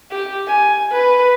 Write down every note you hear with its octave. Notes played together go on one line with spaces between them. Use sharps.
G4
G#5
B4